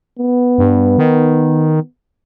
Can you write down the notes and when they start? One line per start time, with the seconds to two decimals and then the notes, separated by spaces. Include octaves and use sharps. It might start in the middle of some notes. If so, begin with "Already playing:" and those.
0.19 B3
0.58 G2
0.98 D#3